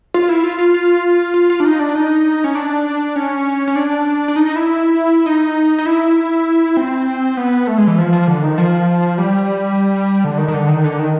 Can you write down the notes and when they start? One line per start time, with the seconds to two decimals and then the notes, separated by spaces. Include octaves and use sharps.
0.14 F4
0.29 E4
0.44 F4
0.59 F4
0.74 F4
1.34 F4
1.50 F4
1.60 D4
1.65 D#4
1.80 D4
1.95 D#4
2.44 C#4
2.55 D4
3.16 C#4
3.68 C#4
3.75 D4
4.28 D4
4.36 D#4
4.46 D#4
4.56 E4
5.26 D#4
5.78 D#4
5.86 E4
6.77 C4
7.37 B3
7.67 A3
7.78 G#3
7.87 E3
7.98 F3
8.13 F3
8.27 D3
8.43 D#3
8.58 F3
9.18 G3
10.24 D3
10.38 D#3
10.48 D#3
10.54 D3
10.68 D#3
10.84 D3
10.99 D#3